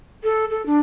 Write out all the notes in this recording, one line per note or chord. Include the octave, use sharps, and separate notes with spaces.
A4
A4
D4